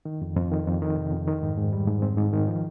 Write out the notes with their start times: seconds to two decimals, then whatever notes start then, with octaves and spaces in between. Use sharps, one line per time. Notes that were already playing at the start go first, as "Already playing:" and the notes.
0.05 D#3
0.22 F2
0.37 F2
0.51 D#3
0.67 F2
0.82 D#3
0.97 C3
1.12 F2
1.27 D#3
1.42 G#2
1.58 G#2
1.73 G3
1.87 G#2
2.02 C4
2.17 G#2
2.33 D#3
2.48 F3